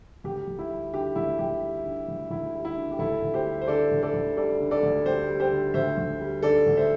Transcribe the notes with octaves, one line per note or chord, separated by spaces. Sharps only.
D2 G4
D2
E4
G3
D3 G4
D2 E4
D2 G4
G3
D3
D2
D2 E4
G3
E4
D3
G4
D2 E4 A4
D2
G4 C5
G3
C5
D3 A4 D5
D2
A4 D5
D2
G3 A4 D5
D3
A4 D5
D2
D2 G4 C5
G3
G4 C5
D3
D2 C5 E5
D2
G3
D3 A4 D5
D2
C5 E5